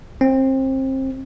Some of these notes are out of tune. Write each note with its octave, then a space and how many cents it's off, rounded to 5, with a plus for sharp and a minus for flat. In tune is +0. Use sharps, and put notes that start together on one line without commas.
C4 +25